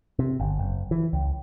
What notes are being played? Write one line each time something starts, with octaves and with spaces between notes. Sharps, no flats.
C3
G1
F#1
E3
C#2